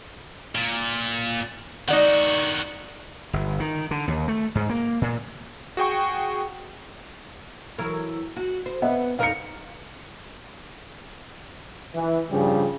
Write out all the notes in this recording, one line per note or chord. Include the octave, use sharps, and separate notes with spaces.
A#2
D#3 D#4 F#4 D5 F#5
G1
D#3
D3
D#2
A3
G#2
A#3
A#2
F#4 G#4 G5 C#6
E3 F#3 A#4
F#4
C5
B3 D#5 E5 F#5
F2 D#4 A#4 F5 C#7
E3
G2 C#3 F3 G3 G#4